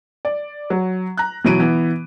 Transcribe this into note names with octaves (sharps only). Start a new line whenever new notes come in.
D5
F#3
A#5 F#6
B2 E3 F#3 D7 D#7
E3 B3